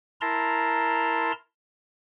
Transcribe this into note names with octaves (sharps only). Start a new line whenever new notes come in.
E4 A#4 A5 A#5 C6